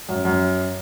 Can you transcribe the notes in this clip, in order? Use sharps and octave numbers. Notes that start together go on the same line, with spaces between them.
F#2
F#2